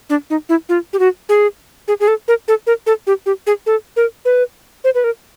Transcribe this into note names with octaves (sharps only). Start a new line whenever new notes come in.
D4
D#4
E4
F4
G4
F#4
G#4
G#4
G#4
A4
A#4
A4
A#4
A4
G4
G4
G#4
A4
A#4
B4
C5
B4
A#4